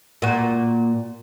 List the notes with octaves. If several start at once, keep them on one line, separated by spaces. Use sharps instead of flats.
A#2 F#4